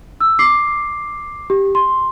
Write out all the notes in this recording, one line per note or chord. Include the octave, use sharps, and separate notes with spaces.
E6
D6 C7
G4
C6